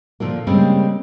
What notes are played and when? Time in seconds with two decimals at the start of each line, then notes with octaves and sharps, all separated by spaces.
0.20 A#2 D3 F3 A#3
0.47 C#3 G3 G#3 A#3 C4 C#4